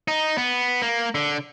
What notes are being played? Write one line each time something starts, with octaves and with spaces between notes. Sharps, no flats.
D#4
B3
A#3
D3